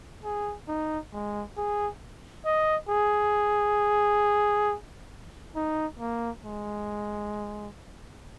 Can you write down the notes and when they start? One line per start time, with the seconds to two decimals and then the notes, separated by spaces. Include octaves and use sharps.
0.24 G#4
0.68 D#4
1.12 G#3
1.57 G#4
2.46 D#5
2.89 G#4
5.56 D#4
6.00 A#3
6.44 G#3